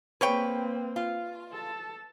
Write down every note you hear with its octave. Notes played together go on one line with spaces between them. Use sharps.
A#3 C4 G#4 B4 C#5 G5
F4
A4 A5